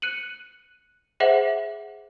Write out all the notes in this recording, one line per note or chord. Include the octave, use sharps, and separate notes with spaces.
F#6 C#7 D#7 F#7
G#4 C5 E5 F#5 F#7